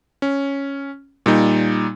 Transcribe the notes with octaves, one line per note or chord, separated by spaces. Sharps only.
C#4
A#2 G3 D#4